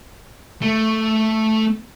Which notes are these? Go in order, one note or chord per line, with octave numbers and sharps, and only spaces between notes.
A3